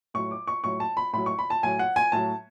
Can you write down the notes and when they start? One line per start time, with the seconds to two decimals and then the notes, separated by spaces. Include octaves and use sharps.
0.14 A2 F#3 C#6
0.31 D6
0.47 C#6
0.64 A2 F#3 C#6
0.80 A5
0.97 B5
1.13 A2 F#3 B5
1.26 C#6
1.39 B5
1.50 A5
1.63 A2 F#3 G#5
1.79 F#5
1.96 G#5
2.12 A2 F#3 A5